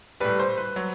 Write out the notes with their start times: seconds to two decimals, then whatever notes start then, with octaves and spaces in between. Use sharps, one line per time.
0.20 A2 G3 B4
0.39 C5
0.58 B4
0.76 F#3